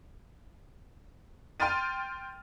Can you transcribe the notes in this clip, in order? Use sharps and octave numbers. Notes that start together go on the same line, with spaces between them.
G5 C6 F6 A6 D#7